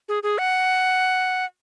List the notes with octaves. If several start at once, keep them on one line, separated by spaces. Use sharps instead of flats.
G#4
G#4
F#5